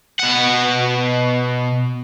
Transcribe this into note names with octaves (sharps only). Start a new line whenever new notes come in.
B2 F#5